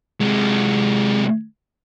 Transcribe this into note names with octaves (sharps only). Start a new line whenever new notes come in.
C3 G#3